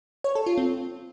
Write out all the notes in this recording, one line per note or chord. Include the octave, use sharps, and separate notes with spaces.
C#5
A4
F4
C4